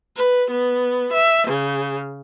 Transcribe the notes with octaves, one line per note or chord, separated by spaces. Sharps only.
B4
B3
E5
C#3